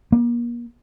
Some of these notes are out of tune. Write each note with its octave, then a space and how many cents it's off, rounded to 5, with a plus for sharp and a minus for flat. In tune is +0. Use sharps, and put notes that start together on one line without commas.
A#3 +35